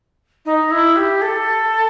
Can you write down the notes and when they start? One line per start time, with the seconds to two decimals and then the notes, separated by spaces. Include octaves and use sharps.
0.45 D#4
0.71 E4
0.96 G4
1.21 A4